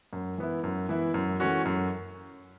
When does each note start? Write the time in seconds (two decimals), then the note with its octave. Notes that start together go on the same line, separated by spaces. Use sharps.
0.13 F#2
0.38 E3 B3 E4
0.64 F#2
0.89 E3 B3 E4
1.14 F#2
1.40 E3 A3 C#4 F#4
1.65 F#2